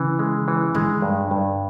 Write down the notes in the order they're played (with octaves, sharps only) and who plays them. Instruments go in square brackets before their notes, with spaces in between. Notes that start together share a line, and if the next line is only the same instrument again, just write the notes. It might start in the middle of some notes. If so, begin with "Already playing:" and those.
Already playing: [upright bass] C#3 [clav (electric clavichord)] E3
[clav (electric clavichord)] G#3
E3
[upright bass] D3 [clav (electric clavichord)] G#3
[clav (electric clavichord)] G2
G2